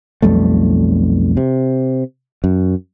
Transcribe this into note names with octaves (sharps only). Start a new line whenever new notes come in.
B1 F2 G3 A3
C3
F#2